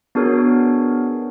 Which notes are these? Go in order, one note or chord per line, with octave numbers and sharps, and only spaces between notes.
B3 D4 F#4 G#4 A#4 C#5